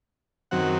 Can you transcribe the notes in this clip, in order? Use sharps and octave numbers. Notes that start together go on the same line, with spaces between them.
F#2 D#3 F#3 C4 F#5